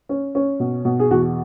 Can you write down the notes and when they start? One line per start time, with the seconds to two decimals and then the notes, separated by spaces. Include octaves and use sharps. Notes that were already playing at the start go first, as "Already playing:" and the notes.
0.09 C#4
0.35 C#4
0.60 B2
0.85 B2
0.99 G#4
1.11 E2 F#4